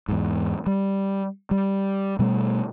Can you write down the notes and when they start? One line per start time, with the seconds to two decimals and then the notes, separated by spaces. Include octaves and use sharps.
0.08 E2 G#2
0.66 G3
1.51 G3
2.19 B2 G3 A3